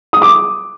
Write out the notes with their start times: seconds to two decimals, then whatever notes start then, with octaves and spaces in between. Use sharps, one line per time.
0.13 D#6
0.22 D6